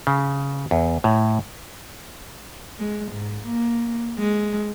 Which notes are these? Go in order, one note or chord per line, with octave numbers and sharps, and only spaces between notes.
C#3
E2
A2
G#3
G#2
A#3
G#3